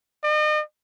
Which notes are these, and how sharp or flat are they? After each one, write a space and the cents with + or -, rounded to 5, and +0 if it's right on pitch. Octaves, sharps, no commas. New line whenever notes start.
D#5 -40